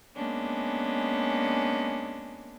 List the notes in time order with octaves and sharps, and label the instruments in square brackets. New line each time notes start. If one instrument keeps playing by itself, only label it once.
[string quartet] G#3 A#3 B3 C#4 D4